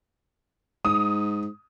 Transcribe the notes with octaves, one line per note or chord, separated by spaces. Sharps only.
G#2 D#6